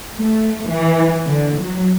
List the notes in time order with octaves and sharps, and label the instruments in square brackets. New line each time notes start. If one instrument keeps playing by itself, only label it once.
[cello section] A3
E3
D3
F#3